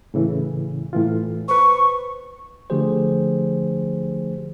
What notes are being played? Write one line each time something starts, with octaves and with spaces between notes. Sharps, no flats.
A2 C#3 E3
A2 E3 F4
B4 C5 C#6
D3 F3 A3 G4 G#4 C5